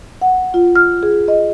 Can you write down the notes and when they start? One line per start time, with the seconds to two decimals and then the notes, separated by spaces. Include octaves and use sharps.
0.22 F#5
0.54 F4
0.76 F6
1.03 G#4
1.28 D#5